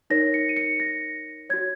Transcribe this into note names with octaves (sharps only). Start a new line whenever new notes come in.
D#4 A#4 C#5 A#6
C#7
D#7
C#7
A#6
F#4 C#5 G#6